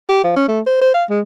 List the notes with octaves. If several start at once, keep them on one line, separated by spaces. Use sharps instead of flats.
G4
F3
C#4
A3
C5
C5
F5
G#3